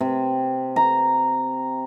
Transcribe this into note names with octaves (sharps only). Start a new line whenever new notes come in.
C3
A#5